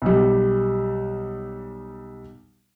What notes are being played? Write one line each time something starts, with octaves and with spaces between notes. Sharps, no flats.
B1 G3